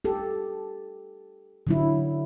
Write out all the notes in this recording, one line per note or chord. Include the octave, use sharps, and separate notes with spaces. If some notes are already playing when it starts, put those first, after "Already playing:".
G4 A4
D3 F#3 E4